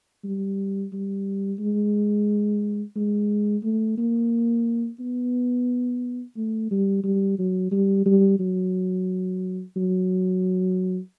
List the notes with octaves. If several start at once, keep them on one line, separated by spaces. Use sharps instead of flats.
G3
G3
G#3
G#3
A3
A#3
B3
A3
G3
G3
F#3
G3
G3
F#3
F#3